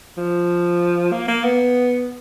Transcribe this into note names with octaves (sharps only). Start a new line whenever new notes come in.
F3
A#3
A#3
B3